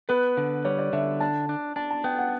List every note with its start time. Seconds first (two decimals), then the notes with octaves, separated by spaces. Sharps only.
0.09 B3 B4
0.37 D3
0.65 G3 C#5
0.79 D5
0.93 D3 E5
1.20 D4 A5
1.49 D4
1.76 D4 A5
1.90 A5
2.04 B3 G5
2.18 F#5